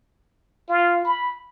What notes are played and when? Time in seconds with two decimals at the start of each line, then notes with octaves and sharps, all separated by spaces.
0.69 F4
1.05 B5